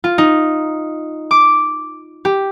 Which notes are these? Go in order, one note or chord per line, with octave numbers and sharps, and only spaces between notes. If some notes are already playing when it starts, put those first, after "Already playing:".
F4
D#4
D6
G4